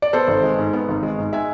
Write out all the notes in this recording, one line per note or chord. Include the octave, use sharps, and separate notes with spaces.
D5
B3 A4 C5
G#1
G#3
G#2
B3
G#1
G#3
G#2
G#3 E5 G#5